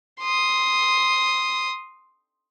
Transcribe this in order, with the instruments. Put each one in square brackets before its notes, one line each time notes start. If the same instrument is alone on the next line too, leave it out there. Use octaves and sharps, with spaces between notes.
[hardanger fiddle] C6 D#6